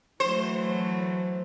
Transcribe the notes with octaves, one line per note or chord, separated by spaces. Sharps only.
E3 F#3 A3 C5